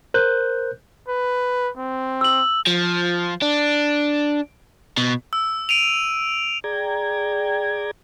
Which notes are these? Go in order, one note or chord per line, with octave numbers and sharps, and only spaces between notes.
A#4 C5 F#6 G6
B4
C4
E6 F#7
F3
D4
B2
E6
D7 D#7 F7
G#4 D5 G5 A#5 G#6